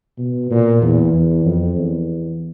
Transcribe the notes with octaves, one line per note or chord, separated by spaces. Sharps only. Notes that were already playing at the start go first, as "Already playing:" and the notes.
B2
A#2
E2
E2
F2
E2